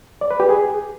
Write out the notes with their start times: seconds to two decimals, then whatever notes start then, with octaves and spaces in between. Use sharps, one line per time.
0.21 D5
0.31 B4
0.40 G4
0.49 G#4